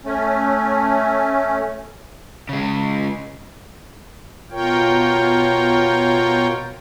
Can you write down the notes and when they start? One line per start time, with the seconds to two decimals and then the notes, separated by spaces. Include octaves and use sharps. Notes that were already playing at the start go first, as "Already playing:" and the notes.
0.05 A3 C#4
2.49 C#3 G#3
4.51 B2 F4 A#4 C#5 G5